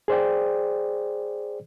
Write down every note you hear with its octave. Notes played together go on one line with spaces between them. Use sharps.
G#4 C5 D5 G5